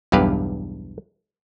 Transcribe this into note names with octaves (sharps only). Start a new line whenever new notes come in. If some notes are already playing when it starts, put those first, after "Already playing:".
B1 E2 G2 G4 B4 F5